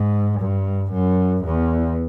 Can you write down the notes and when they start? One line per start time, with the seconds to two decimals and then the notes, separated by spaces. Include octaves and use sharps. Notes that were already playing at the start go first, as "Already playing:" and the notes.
Already playing: G#2
0.41 G2
0.93 F#2
1.45 E2